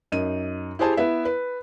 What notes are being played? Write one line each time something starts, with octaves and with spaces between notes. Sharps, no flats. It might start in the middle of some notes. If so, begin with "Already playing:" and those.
F#2 D#4 D#7
E4 G4 G#4 C5 G#5 A5
B3 E4 B4 E5
B4